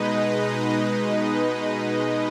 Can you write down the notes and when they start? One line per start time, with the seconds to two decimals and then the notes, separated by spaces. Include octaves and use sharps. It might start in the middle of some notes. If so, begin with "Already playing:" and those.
Already playing: B2 G#3 D#4 B4 D#5